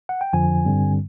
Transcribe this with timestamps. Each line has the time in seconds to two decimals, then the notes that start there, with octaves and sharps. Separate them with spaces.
0.09 F#5
0.21 G5
0.33 F2 D3 F3 G#5
0.65 G2 D3 G3 C4